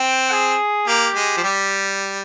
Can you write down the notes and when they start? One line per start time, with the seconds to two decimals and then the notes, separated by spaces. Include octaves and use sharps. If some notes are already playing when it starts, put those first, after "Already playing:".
Already playing: C4 G5
0.31 G#4
0.87 A#3 G4
1.15 G#3
1.37 F3
1.43 G3